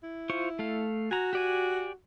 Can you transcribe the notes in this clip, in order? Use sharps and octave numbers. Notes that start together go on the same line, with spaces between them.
E4
F4 C5 C#6
A3 A4 F5
F#4 G#5 A#5
G4 D5 G#5